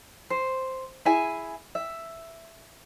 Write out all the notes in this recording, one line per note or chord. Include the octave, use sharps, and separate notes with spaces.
C5
E4 G#4 E5 G#5
E5